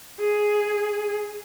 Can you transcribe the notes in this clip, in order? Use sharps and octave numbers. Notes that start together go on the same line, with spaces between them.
G#4